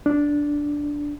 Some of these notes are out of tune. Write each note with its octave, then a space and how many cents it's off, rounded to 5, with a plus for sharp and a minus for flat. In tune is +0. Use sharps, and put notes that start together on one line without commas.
D4 -5